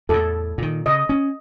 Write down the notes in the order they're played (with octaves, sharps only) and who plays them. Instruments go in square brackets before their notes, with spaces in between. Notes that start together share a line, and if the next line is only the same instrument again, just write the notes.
[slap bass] E2 A2 [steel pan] A4
[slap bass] A#2 D#3
[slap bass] C#3 [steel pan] D#5
[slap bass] C#4